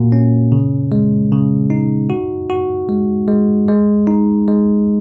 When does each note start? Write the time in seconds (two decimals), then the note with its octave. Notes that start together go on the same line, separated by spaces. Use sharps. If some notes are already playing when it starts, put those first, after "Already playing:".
Already playing: A#2 A#3 F#4
0.12 C#4
0.52 C#3
0.92 G#3
1.32 C#3
1.70 D#4
2.10 F#4
2.50 F#4
2.89 G#3
3.28 G#3
3.68 G#3
4.07 D#4
4.48 G#3